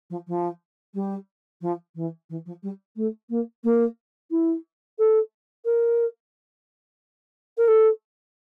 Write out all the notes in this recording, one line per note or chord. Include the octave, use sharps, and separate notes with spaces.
F3
F3
G3
F3
E3
E3
F3
G3
A3
A#3
A#3
E4
A4
A#4
A#4
A4